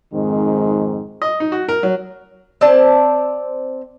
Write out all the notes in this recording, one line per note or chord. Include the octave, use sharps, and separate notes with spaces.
F2 G#2 D#3 G#3 C4
D#5
D#4
F#4
A#4
F#3
C4 C5 D5 A5